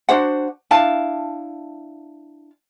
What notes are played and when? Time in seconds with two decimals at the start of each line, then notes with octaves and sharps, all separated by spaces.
0.09 D4 F#4 C5 F#5
0.71 D4 E4 F5 A5